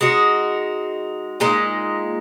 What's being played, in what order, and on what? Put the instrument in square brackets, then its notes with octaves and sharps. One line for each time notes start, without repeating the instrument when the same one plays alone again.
[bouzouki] G#3 D#4 F#4
A#2 G#3 D#4